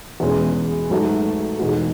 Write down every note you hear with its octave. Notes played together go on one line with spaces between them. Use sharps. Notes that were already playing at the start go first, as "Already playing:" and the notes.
E2 B2 G#3 C#4
G#2 F#3 A3
E2 B2 G#3 D#4 F#4